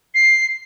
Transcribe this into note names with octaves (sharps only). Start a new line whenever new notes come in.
C7